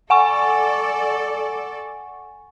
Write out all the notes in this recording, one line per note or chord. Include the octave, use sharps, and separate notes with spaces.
A4 D5 F#5 G#5 C#6